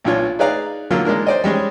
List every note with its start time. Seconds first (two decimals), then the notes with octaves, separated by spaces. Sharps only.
0.04 B1 A#2 D4 F4 C#5
0.39 D#4 G#4 B4 D5 F5 A#5
0.91 D3 F#3 A#3 F4
1.05 G#3 A#3 D4 A#4
1.27 C5 D5 D#5
1.44 G3 G#3 C#4 G#4